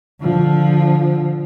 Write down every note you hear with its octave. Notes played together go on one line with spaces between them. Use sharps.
D3 F3